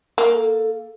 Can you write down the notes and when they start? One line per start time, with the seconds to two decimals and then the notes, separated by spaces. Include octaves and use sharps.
0.18 A#3
0.34 A4